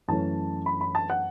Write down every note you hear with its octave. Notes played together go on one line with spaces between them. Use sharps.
F#2 E3 A3 C#4 A5
B5
B5
A5
F#5